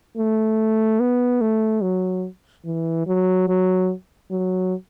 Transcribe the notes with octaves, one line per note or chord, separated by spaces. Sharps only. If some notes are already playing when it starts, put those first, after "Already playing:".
A3
B3
A3
F#3
E3
F#3
F#3
F#3